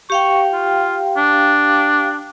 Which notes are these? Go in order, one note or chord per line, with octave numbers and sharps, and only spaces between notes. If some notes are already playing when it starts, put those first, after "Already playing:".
G4 F5 G5 C#6
F4
D4